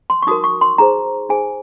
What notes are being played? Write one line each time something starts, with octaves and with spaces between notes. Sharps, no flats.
C6
C#6
D#4 F#4 A#4 D#6
C#6
C6
D#4 G#4 C5 A#5
D#4 G#4 C5 G#5